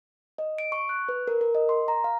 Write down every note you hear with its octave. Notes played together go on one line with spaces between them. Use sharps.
D#5
D7
C#6
F#6
B4
A#4
A#4
D#5
C6
A#5
F5